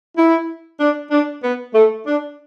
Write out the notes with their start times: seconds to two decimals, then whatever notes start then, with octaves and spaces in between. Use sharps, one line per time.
0.17 E4
0.79 D4
1.10 D4
1.42 B3
1.74 A3
2.06 D4